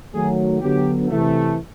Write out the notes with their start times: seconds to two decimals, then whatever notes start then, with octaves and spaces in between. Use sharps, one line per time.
0.14 D#3 F#3 A3 G#4
0.61 D3 F#3 B3 G4
1.09 C3 E3 A3